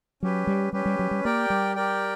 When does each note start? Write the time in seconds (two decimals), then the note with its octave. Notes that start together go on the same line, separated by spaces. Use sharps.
0.23 F#3 C#4 G4 B4
0.47 G3
0.73 G3 C#4 G4 B4
0.86 G3
0.99 F#3
1.11 G3
1.24 A#3 G4 A#4 D5 G5
1.50 G3
1.75 G4 A#4 D5 G5